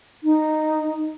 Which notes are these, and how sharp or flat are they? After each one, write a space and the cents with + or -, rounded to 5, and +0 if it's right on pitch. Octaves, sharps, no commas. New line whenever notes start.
D#4 -10